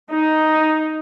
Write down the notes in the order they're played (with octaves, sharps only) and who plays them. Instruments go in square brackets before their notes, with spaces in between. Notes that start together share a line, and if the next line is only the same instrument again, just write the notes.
[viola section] D#4